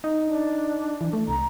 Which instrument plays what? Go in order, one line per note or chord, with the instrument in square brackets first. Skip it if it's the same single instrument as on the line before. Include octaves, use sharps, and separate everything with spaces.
[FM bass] D#4
[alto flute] D4
[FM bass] E3
A3
[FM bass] C2 [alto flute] A#5